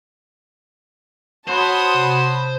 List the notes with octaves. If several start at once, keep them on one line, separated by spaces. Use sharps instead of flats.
F#4 C5 C#5 A5 B5 D#6
C3